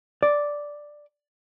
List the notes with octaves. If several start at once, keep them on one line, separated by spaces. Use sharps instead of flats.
D5